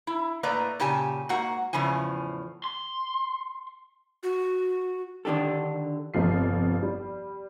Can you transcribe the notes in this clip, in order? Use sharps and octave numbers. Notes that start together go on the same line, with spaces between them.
E4
A2 A#3 B4 D5 D#5 A#5
A#2 C#3 G4 G#5 A5
G#2 A#3 F#4 F#5
E2 A2 C#3 F3 G#5
C6
F#4
D3 D#3 D4 G4 A4
G1 F2 C3 F3 C7
G3